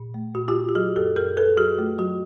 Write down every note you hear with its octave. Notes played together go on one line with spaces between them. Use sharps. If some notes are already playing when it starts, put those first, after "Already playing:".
Already playing: A#2
A3
A#2 F#4
F4 G4
A#2
G4
F#3 F#4 G#4
F#2 G4 A4
F#2 G#4 A#4
F#2 A4 B4
F#3 F#4 G#4
A3 F4
F#3 F#4